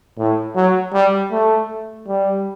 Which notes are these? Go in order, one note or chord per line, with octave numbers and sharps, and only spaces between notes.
A2
F#3
G3
A3
G3